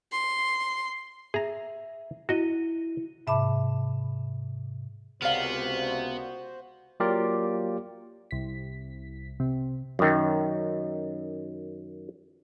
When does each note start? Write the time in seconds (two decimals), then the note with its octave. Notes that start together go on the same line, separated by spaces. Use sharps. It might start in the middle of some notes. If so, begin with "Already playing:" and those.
0.12 C6
1.34 G#4 E5 A#5
2.29 E4 F#4 D#5 D#7
3.27 G#2 C3 E5 A5 B5 D6
5.22 C#2 C3 B3 F#4 A#4 C5 D5 F5
7.00 F#3 A#3 F4 G4 A#4 D5
8.31 C2 B6
9.40 C3
9.99 F#2 D#3